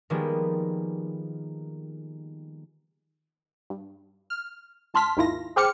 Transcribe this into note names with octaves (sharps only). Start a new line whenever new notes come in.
D#3 F3 G3 G#3 A#3 B3
G2
F6
C#2 A5 C6 F6 B6
D#2 G#2 D#3 E4 F4 A#6
G#4 C5 G5 D6 F6 C#7